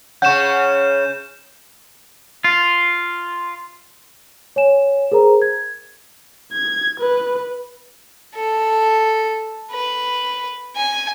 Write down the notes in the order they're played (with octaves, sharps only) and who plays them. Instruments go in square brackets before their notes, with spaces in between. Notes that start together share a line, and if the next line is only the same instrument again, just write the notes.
[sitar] C#3 C#4 [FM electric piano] F#5 C#6 [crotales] G6 E7
[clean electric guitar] F4
[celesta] C#5 G#5 E7
G#4 A#4 C5 A#5
G#6
[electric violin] G#6
B4
[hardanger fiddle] A4
B4
G#5